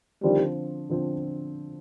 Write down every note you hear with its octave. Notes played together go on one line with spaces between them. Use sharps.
D3 D#3 F3 G3 C4
D3 F3 C4